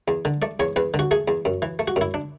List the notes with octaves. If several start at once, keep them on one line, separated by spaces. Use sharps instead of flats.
E2
D3
A3 D5
E2 C#5
E2 B4
D3
F#4
A3 G#4
E2
F#2
E3
A3
F#4
F#2 E4
D4